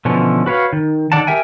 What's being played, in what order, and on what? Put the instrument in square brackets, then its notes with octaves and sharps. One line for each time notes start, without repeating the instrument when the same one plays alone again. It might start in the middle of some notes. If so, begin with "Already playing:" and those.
[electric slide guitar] B2 D3 E3 F3 C#4
F#4 B4 C#5 F5
D#3
D3 D#3 D5 F#5 A5
G4 A#4 E5 G5 G#5